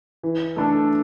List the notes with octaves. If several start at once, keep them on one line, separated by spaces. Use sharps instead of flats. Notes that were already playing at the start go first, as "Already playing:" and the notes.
E3
A3 D4 A4